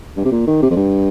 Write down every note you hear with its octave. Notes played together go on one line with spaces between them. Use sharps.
G2
C3
A#2
D#3
C3
F2
G2